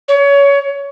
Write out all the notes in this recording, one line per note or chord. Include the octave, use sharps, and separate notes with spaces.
C#5